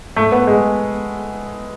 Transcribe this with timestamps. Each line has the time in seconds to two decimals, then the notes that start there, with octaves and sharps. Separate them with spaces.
0.16 A3
0.32 B3
0.47 G#3